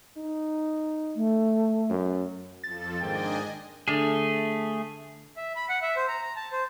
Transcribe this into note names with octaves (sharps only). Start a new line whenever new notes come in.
D#4
A3
F#2
F2 F3 A4 A6
G#2 D#3 A#3 C4 D4 D#5 G5 G#5
D3 A3 D4 G#4 A4
E5
B5
F#5
E5
C5
A#5
A#5
A5
C5